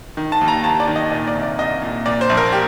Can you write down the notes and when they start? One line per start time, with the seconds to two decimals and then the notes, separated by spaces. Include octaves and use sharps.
0.17 D#3
0.32 A5
0.41 D#2
0.48 A#5
0.64 D#2 A5
0.80 D5
0.87 D#3
0.96 D#5
1.12 A#2 D#5
1.27 D5
1.35 C2
1.43 D5
1.58 C2 D#5
1.82 A#2
2.06 A#2 D5
2.21 C5
2.29 A#1
2.37 A#4
2.52 G4